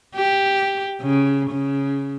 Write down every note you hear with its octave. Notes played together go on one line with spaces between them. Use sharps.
G4
C#3
C#3